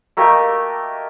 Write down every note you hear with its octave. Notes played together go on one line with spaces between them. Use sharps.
A3 A#3 G4 D#5